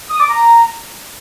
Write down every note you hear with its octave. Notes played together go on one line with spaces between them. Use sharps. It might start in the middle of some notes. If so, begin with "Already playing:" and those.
D#6
D6
A#5